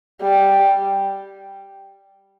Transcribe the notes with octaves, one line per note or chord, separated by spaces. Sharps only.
G3